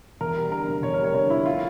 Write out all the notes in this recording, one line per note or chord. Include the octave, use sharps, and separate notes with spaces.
E2 A#4
G3
D3 A#4
F1
E2 C#5
A#4
G3 C#5
D3 C#5
F1 E4
A2 F4